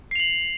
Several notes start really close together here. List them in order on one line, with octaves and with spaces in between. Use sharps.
C7 F7 F#7